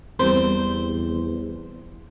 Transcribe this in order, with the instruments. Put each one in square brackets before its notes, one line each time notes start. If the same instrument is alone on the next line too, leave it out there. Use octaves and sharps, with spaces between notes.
[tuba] E2 [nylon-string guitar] G3 C4 [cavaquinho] C5